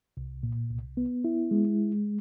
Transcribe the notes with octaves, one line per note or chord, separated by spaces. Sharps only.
C2
A#2
C2
B3
E4
G#3